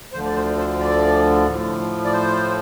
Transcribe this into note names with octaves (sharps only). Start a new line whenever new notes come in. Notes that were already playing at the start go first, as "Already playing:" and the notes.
D2 D3 F3 C5
D5
C5
C5
D5
A2 F3
D5
C5